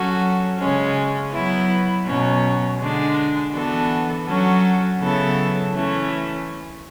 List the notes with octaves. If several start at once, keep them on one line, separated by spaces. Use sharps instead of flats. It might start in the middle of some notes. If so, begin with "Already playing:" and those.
Already playing: F#3 C#4 F#4 A4
C#3 G#3 C#4
F#3 B3 E4
B2 F#3 C#4
D3 G#3 D4
E3 B3 D4 F#4 A4
F#3 C#4 F#4 A4
C#3 F#3 B3 E4 A4
E3 A3 C#4